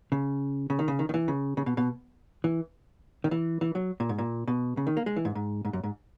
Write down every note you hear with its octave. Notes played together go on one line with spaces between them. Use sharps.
C#3
C#3
D#3
C#3
D#3
D#3
E3
C#3
C#3
B2
B2
E3
D#3
E3
E3
F#3
A#2
G#2
A#2
B2
C#3
D#3
A#3
G#3
E3
G#2
G#2
G#2
F#2
G#2